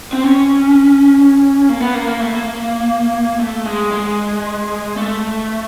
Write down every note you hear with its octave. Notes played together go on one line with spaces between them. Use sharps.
C4
C#4
A#3
B3
A#3
A#3
A3
A#3
A3
G#3
G#3
A3